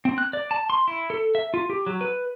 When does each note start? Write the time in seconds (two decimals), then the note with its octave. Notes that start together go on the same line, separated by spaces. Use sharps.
0.05 C4
0.18 F#6
0.33 D5
0.51 A5
0.70 C6
0.88 E4
1.10 A4
1.35 E5
1.54 F4
1.70 G4
1.87 F#3
2.01 B4